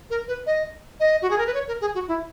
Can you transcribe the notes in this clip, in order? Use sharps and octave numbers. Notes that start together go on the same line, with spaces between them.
A#4
B4
D#5
D#5
F#4
G#4
A#4
B4
C#5
A#4
G#4
F#4
E4